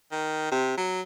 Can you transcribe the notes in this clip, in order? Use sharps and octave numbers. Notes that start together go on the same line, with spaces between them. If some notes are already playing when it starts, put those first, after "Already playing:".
D#3
C3
F#3